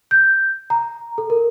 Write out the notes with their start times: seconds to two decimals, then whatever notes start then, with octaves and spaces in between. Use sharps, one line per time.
0.11 G6
0.70 A#5
1.18 A4
1.30 A#4